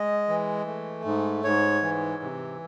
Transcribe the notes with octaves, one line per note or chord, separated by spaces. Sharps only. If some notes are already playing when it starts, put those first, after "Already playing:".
Already playing: G#3 D#5
E3
A3
G#2
G#2 C#5
E3
C3